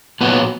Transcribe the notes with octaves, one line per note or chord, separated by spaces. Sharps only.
A#2 F#3 B3